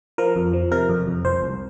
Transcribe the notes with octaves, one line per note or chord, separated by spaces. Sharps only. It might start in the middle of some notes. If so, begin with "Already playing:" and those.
F3 A#4
F2
F3
C3 A#4
F2
F2
C2 C5
C2